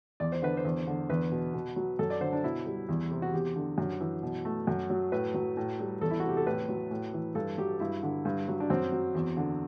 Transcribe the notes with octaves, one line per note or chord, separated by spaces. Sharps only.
E2 D5
C5
D3 B4
C5
E2
D3
E2 B4
B2
B2
F#3
F#2 A4
D5
D3 C5
D4
B2 E4
G3
E2
C3
F#4
E2 G4
D3
F#2
E3
B2
A3
F#2
F#3
A2 B4
F#3
A2
G3
E2 A4
E4
F#4
C3 G4
A4
A2 B4
F#3
A2
E3
G2 A4
F#3 G4
G2 E4
D3
G2
F#3
D4
F#2 C4
F#3
E2
D3